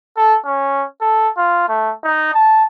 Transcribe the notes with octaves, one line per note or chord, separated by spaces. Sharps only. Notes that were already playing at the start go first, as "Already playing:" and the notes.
A4
C#4
A4
F4
A3
D#4
A5